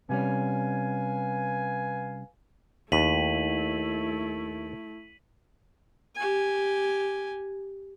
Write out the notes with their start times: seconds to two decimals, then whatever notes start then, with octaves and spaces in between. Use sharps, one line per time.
0.09 C3 G3 C#4 B4 F5 G#5
2.92 D#2 A3 E4 B6 D#7 F#7
6.16 G4 G#5